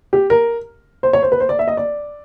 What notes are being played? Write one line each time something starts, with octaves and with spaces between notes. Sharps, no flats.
G4
A#4
C5
C#5
C5
B4
C5
D5
E5
D#5
D5